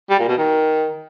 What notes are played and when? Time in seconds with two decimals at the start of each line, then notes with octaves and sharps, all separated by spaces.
0.10 G3
0.19 A#2
0.28 B2
0.37 D#3